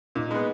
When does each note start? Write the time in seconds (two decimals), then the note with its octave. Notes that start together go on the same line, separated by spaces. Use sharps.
0.15 A#2 D#4
0.31 G#3 B3